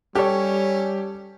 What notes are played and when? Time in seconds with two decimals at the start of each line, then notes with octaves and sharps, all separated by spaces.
0.15 G3 C#4 G4 A4 C#5